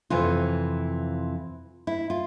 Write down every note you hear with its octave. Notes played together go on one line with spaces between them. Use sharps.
F2 C3 E3 F4
E4
F4